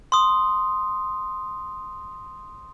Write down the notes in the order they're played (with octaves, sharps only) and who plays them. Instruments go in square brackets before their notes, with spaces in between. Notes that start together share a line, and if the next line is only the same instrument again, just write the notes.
[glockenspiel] C6 D#6